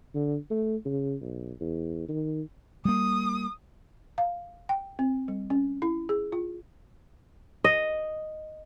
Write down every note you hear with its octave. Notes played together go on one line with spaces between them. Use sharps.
D3
A3
C#3
B1
E2
D#3
G3 A#3 D#6
F5
G5
C4
G3
C#4
E4
G#4
F4
D#5